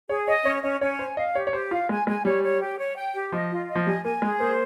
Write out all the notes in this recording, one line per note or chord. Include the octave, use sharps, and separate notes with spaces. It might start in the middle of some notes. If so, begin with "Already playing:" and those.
G#4 C#5
C#5 D#5
C#4 C#5
C#4 D#5
C#4 C#5
C5 G#5
D#5 F5
G4 C#5
C#5
G4 C5
F4 F5
G#3 G#5
G#3 G#5
G3 C#5
C#5
G4
C#5
G5
G4
F3 D#5
F4
D#5
F3
G3 G#5
A#3 G#5
G#3 G#4
A#3 C5